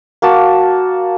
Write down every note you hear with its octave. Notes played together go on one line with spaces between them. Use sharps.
A#3 F#4 A5